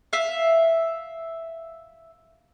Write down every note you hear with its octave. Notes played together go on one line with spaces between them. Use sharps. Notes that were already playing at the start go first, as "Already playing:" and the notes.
E5 F5